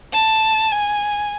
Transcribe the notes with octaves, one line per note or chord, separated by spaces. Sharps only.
A5
G#5